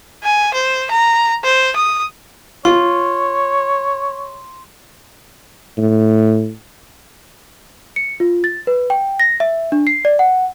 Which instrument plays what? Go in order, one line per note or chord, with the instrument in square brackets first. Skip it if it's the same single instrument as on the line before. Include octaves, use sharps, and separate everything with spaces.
[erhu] G#5
C5
A#5
C5
D#6
[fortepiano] F4 [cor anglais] C#5 [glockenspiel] C6
[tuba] A2
[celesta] C#7
F4
A6
B4
G5
A#6
E5
D4
C7
D5
F#5